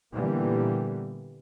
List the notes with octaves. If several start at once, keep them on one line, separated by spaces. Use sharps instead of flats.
A#2 D3 E3 G3 A#3 B3